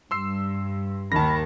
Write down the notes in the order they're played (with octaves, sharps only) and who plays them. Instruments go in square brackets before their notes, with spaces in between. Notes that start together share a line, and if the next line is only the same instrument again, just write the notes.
[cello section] G2 [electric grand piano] C6 E6 C7
[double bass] D#2 D#3 [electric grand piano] A5 A#6 [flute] B5